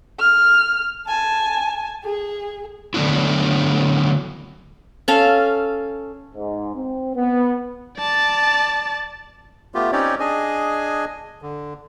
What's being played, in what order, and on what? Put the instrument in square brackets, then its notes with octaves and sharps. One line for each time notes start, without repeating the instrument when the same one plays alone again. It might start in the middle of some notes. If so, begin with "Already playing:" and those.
[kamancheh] F6
G#5 A5
G#4
[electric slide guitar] D3 F#3 A3 B3 D4 E4
[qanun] C#4 A4 F5
[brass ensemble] G#2
C4
B3
[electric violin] D5 A5
[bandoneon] A3 B3 F4 G4
C4 C#4 D#4 G4 C#5 D5
D4 G#4 D#5 G#5
D3